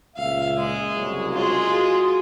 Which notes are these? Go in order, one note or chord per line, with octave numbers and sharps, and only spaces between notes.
C#2 A#2 E5 F5
G#3
F#1 C2 F#3
G#3 F4
F#4 G#4